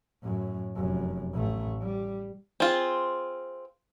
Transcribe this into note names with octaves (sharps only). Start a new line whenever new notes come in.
F#2 A2
F1 F#2
A1 A3
G3
C4 F4 G#4